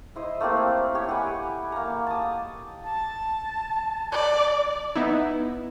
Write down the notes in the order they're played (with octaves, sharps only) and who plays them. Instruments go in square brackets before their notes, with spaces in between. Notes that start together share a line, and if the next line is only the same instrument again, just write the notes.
[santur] E4 C5 D#5
A3 A#3 C4 G4
G4 C#5
G4 F#5 G#5 B5
A#3 A#5
A5 D#6
[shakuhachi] A5
[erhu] D5
[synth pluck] B3 D#4 E4